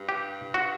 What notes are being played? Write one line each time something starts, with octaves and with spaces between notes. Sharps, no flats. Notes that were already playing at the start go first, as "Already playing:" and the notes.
Already playing: G2
G4
F#4